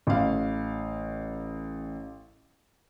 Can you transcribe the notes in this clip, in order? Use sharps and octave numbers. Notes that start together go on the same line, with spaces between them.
A1 F5